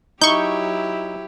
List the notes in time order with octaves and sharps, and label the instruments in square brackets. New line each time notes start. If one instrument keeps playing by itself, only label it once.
[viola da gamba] F#3 E4 G4 [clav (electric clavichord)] D#4 [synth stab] C#6 G6